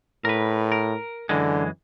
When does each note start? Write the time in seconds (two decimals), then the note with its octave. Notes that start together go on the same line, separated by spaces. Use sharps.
0.25 A2 A#4 B4
0.72 A#4
1.29 F#2 D3 E3 G#3